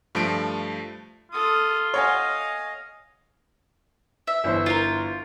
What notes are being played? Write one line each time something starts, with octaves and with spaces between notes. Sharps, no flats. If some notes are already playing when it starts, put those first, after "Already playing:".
G2 F3 A3 A5 D7
F4 A4 D#6
C#5 D#5 F5 F#5 G#5
E5
G1 E3 C5
F4 A#4